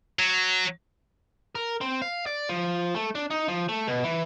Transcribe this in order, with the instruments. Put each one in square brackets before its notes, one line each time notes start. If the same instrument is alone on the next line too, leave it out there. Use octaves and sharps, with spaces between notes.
[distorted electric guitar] F#3
[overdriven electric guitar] A#4
C4
F5
D5
F3
A3
D4
D#4
F3
A3
B2
E3